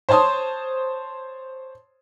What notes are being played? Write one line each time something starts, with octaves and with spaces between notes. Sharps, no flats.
C5 C#5 A5 C6 D#6